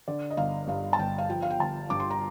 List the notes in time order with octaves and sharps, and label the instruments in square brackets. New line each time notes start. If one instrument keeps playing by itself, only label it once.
[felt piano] D3 D5
D#5
G1 F5
G2 F5
A5
G1 G5
F5
F3 G5
F5
G5
G1 A5
G2 D6
C6
A#5